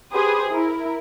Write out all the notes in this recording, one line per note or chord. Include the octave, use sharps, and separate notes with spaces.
G4 G#4 B4 C5 D#6
E4 A#4